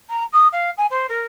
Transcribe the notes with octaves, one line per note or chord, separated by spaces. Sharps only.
A#5
D#6
F5
G#5
C5
A#4